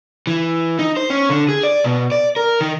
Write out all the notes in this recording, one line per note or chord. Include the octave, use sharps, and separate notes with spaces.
E3
D#4
C5
C#4
D3
G#4
D5
B2
D5
A#4
D#3